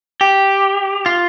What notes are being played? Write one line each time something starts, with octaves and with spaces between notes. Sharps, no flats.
G4
F4